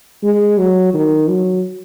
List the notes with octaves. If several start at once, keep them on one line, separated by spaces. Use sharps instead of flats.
G#3
F#3
D#3
F#3